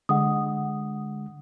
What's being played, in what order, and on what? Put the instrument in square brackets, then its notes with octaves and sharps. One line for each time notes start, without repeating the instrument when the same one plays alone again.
[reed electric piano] D3 G#3 [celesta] F#5 D#6